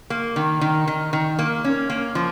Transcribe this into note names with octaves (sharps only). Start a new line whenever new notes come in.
A#3
D#3
D#3
D#3
D#3
A#3
C#4
A#3
F3